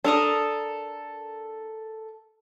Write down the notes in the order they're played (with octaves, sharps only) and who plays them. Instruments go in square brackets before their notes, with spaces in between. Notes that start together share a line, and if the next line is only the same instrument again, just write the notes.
[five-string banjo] D4 [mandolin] A4 A#4 D#6